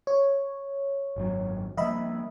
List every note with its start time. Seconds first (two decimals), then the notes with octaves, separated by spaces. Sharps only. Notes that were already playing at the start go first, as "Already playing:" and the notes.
0.07 C#5
1.16 G#1 F#2 F#3
1.77 F3 G3 A#3 D#5 E5 B5